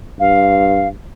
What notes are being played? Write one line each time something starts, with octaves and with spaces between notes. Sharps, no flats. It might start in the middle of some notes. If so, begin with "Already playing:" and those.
G2 F5